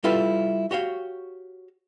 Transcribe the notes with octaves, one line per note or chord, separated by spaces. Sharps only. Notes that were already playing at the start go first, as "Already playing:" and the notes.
G3 E4 F4 A4 B4
F#4 G4 C#5 F5